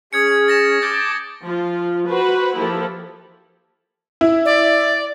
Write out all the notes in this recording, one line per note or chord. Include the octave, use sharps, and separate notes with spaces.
C#4 G#4 D#6 G#6 C#7
A6 A#6 E7
A5 D6 G6 A6
F3 F4
F#4 B4 C5
F3 A#3 E4 G4 A4
E4
D5